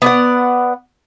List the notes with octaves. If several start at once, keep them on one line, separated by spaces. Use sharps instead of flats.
B3 D5 F#5